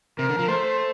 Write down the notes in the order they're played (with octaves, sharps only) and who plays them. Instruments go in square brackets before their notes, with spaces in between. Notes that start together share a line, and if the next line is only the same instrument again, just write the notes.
[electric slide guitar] C3 [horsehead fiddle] A#4
[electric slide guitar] D3
F3
[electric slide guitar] A3 [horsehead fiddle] C5